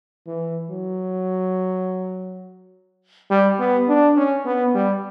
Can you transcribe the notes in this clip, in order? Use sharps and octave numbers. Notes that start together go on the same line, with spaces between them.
E3
F#3
G3
B3
D4
C#4
B3
G3